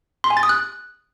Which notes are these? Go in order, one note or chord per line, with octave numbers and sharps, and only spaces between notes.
C6
G#5
A6
D#6
F#6